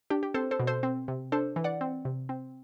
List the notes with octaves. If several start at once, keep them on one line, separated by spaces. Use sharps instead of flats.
D4 G4
G4
C4 A4 C5
A4 C5
B2
A4 C5
C4
C3
D4 A4 C5
E3
D5 F#5
C4
C3
C4